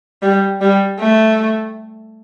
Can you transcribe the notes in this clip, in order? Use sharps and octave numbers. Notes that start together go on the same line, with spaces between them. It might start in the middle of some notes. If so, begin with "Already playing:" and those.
G3
G3
A3